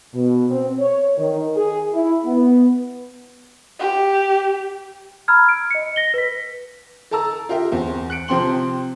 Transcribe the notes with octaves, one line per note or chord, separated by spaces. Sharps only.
B2
C4
C#5
D#3
G#4
E4
B3
G4
A#5 B5 E6 F6 G#6
D7
D#5 C#7
A#6 G7
B4 B6
A4 A#4 A5 A#5 E6
F4 G4 A#4 E5 G5
E2 C4
F#6 C#7 D7
C3 F3 C4 G5 C6 F#7